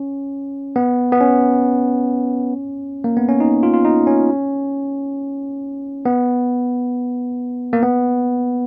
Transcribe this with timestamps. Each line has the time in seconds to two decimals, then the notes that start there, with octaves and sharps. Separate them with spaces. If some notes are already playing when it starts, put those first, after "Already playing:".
Already playing: C#4
0.76 B3
1.12 B3
1.20 C#4
3.04 A#3
3.17 B3
3.29 C#4
3.40 D#4
3.63 F4
3.74 F4
3.85 D#4
4.07 C#4
6.06 B3
7.73 A#3
7.83 B3